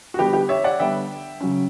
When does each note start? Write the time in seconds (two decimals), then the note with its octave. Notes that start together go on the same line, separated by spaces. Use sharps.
0.14 F#4
0.19 D3 G3 B3 G4
0.33 G4
0.49 C#5 E5
0.64 D5 F#5
0.79 D3 G3 B3 E5 G5
1.40 C#3 F#3 C#4